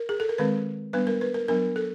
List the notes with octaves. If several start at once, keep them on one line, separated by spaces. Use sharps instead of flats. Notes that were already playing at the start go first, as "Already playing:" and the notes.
Already playing: A#4
G#4
A4
A#4
D#3 G#3 C4 B4
G3 B3 D4 B4
A#4
B4
A#4
F#3 B3 D4 A#4
A4